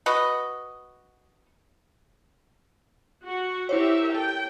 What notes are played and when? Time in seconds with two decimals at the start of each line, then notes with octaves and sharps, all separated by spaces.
0.06 F#4 B4 D#5
3.24 F#4
3.69 E4 G4 A#4 C5 C#5 E5
4.15 A4 G5